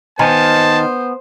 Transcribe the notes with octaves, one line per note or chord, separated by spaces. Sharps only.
D#3 B3 C5 G#5 A5